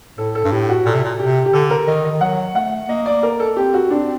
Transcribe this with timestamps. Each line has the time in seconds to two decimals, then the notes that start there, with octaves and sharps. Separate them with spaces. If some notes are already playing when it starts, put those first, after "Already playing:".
0.18 A2 A4
0.35 A4
0.45 G2
0.52 A2 G4
0.69 F#4
0.86 A#2 A4
0.95 C3
1.04 A#2
1.19 C3 G4
1.46 G4
1.53 D3 A4
1.70 A#4
1.87 D#3 D#5
2.04 D#5
2.12 D#3
2.21 F#3 F#5
2.55 A3 F#5
2.89 A#3 D#5
3.06 D5
3.23 A#4
3.40 A4
3.56 C4 G4
3.74 F#4
3.90 C4 D4